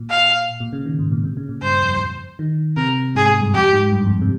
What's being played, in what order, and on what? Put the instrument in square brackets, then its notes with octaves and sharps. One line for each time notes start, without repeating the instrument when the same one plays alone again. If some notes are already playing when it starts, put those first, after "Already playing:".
Already playing: [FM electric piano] A#2
[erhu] F5
[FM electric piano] A#2
C#3
D#3
G#2
A#2
C3
C#3
A#2
[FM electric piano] G2 [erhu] C5
[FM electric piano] F2
G2
F2
D#3
[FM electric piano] C3 [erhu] A#4
[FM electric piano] G#2 [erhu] G#4
[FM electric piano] G#2
G2
[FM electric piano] F2 [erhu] G4
[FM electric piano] G#2
G2
F2
C3